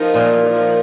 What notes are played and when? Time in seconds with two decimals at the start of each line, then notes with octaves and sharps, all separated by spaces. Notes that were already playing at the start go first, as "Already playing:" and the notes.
Already playing: F3 D#4 A#4
0.14 A#2
0.43 F3 D#4 A#4